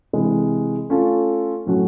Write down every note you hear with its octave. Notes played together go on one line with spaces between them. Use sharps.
C3 E3 G#3
A3 C#4 F4 A4
A2 F#3 A3 C#4 F#4